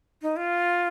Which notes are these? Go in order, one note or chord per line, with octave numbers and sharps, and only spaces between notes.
D#4
F4